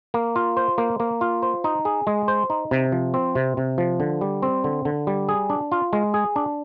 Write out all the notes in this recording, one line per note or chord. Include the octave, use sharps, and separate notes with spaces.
A#3
F4
C5
A#3
A#3
F4
C5
D#4
G#4
G#3
C5
D#4
C3
F3
C4
C3
C3
F3
D3
G3
C4
D3
D3
G3
G#4
D4
F4
G#3
G#4
D4